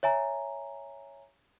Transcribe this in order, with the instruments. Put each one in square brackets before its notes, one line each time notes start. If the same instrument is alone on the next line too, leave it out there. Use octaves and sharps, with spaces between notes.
[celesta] C#5 E5 G#5 A#5